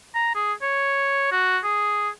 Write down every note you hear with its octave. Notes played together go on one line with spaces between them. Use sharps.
A#5
G#4
C#5
F#4
G#4